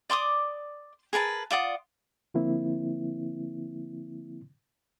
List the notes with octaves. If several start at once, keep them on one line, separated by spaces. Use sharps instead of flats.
D5 C6 D6 D#6
G#4 A#4 B4 A5
F4 D5 F#5 D#6
D3 F3 A#3 C4 E4